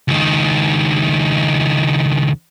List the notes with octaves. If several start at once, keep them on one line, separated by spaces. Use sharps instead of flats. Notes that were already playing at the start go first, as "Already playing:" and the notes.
C#2 D#3